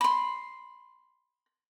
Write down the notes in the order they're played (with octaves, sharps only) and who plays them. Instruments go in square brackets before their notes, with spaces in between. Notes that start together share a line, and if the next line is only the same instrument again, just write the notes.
[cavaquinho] B5 C6